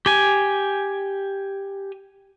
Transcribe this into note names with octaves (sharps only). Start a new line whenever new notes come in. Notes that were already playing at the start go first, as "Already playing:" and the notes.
G4 G#5